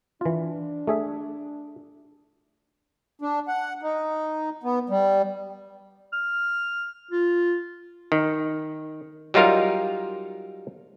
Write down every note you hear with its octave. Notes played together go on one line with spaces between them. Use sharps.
E3 D4 F4
A3 G#4 E5
D4
F#5
D#4
B3
G3
F6
F4
D#3
F#3 G3 D#4 F4 A#4 F5